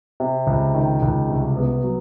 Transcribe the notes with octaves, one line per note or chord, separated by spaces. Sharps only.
C3
C#2
D#3
C#2
C2
B3
F#3